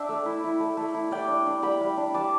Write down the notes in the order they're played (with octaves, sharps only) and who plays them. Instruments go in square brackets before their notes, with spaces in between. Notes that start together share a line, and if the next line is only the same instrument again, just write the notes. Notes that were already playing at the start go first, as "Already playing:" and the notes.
Already playing: [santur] D4 E5 G5 A5
A3
E4
E4
A3
A3
E4
G3 D5 G5
D4
D4
G3 G5 B5
G3
D4
G3 A5 D6